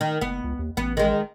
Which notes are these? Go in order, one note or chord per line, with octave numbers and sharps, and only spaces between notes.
D#3
F#1 B3
C#2
D#2
A1 B3
D#3 G#3